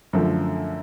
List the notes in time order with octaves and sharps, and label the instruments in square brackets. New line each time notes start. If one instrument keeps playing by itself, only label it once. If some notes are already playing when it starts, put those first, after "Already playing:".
[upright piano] F#2 D3 F3 A3